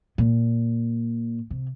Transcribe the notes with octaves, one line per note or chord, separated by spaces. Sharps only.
A#2
C3